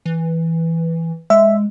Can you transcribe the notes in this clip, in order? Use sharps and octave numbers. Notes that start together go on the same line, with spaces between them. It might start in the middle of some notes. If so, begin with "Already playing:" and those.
E3
G#3 E5